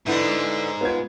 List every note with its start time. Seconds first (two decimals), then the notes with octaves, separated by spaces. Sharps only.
0.06 G#2 D3 B3 E4
0.81 B3 F4 G#6